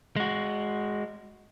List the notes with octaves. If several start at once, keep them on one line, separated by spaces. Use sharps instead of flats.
G#3 F#4